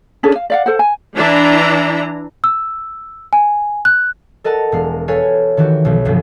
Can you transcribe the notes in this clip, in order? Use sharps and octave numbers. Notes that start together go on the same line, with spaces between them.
C#4 D4 G#4 A4
F5
D5 F5 F#5
A4 C5 F#5
G#5
E3 D4 E4 A#5
E6
G#5
F#6
A4 A#4 D#5 F#5 A5
E1 G#3 F5
A4 B4 C#5 F5 G#5
D#3 E3 F#4 G4
B1 B2 F3
G1 C2 F3 F#3